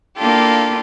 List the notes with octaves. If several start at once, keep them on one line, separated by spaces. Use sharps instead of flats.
A#3 D4 E4 F4 G4 A4